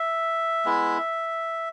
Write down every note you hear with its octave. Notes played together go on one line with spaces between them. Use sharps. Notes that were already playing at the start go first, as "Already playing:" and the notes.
Already playing: E5
G#3 B3 E4